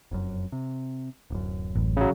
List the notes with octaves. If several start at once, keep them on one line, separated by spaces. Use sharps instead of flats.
F1 F#2
C3
D1 F#2
A1
C#3 F#3